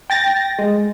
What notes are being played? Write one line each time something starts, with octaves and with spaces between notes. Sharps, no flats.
G5 A6 A#6
G#3